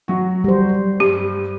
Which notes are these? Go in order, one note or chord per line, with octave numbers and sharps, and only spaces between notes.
F#3 F#4
G3 C5
G2 G4